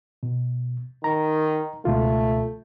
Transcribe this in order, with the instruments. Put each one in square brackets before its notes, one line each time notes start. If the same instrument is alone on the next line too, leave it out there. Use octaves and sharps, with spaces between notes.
[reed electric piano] B2
[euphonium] D#3 [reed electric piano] A#5
[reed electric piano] C#2 B2 F4 [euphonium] A3